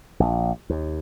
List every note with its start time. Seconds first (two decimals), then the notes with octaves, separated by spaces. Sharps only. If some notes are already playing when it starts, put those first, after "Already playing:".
0.20 A#1
0.70 D#2